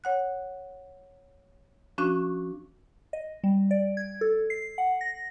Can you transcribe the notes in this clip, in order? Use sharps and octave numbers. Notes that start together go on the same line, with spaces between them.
C#5 F#5 F#6
F3 C#4 D4 F#4 C#6 F#6
D#5
G3
D5
G#6
A4
C7
F#5
A#6